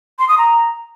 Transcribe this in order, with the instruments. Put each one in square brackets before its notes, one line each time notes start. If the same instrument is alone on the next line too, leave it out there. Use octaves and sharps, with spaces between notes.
[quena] C6
D#6
A#5